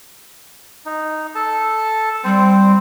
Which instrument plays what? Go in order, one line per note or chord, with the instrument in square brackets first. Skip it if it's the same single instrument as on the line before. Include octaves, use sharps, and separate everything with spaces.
[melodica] D#4
A4 A5
[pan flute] G3 [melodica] C4 C5